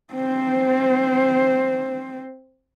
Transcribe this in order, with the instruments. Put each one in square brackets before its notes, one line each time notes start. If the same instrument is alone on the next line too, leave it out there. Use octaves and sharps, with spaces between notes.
[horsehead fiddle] C4 C5